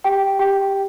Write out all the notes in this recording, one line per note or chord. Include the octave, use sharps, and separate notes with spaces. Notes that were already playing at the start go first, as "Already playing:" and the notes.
G4 G5
G4 G5